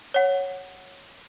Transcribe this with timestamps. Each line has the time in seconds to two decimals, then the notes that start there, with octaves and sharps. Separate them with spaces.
0.14 C#5 F#5